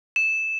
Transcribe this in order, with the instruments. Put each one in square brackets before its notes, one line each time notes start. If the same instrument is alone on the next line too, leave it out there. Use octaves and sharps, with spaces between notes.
[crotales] E7